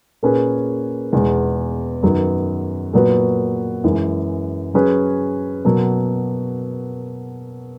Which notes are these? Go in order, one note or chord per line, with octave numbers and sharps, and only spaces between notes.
A#2 A#3 C#4 G#4 B4
E2 B2 G#3
F#2 D#3 F#3 B3
A#2 F#3 B3 F#4 B4
F#2 E3 G#3
F#3 C#4 G#4 B4
B2 F#3 A#3